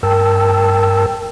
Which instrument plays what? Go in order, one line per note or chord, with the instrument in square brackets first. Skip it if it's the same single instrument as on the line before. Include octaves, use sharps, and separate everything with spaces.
[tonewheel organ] G2 A#4 G5 A5 E6